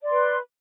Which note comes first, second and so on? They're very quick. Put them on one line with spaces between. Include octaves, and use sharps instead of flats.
D5 C6 B4